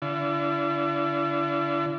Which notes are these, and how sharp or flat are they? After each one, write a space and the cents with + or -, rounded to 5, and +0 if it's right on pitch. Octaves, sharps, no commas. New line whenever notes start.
D3 -25 E4 +45